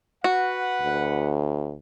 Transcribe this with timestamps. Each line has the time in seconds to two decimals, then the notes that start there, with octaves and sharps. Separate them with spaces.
0.24 F#4 B4 F#5
0.82 D2